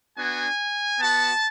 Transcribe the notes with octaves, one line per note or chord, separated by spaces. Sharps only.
B3 D4 F#4 G#5
B3 F#4 A5